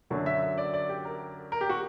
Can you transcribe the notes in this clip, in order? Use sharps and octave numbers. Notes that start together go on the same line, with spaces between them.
F#2 D3 F#3
E5
E5
D5
D5
G4
A#4
A#4
G4
F#4